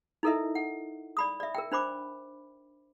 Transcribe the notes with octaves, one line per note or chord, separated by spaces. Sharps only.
D#4 E4 A4 A#4 D#5 E5
F#5
D5 B5 D#6
D5 E5
A#4 G5
D4 C5 B5 D6